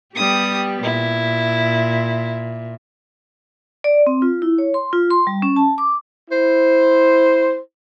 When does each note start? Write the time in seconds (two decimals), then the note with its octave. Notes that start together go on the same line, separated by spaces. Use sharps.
0.16 G3 B3 G4 D#6
0.83 A#2 E4
3.84 D5
4.07 C4
4.22 F4
4.42 E4
4.58 C#5
4.74 C6
4.93 F4
5.11 C6
5.27 G3
5.42 C#4
5.56 A5
5.78 D6
6.30 E4 C5